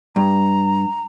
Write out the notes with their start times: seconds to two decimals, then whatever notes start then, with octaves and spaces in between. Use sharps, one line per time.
0.16 G2 A#5